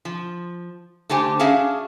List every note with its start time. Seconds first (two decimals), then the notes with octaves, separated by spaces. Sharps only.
0.05 F3
1.09 D3 A3 D4 G4 C5 G#5
1.39 C#4 D4 F#4 G#4 E5 F5